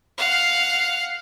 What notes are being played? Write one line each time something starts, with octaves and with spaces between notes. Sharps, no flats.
F5 F#5